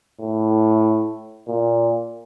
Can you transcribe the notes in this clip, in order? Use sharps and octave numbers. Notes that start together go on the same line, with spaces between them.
A2
A#2